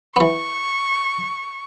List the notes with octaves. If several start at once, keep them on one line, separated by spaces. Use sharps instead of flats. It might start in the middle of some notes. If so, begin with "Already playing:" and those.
E3 B3 C#6